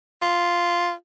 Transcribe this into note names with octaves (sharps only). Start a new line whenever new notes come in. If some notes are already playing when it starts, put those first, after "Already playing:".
F4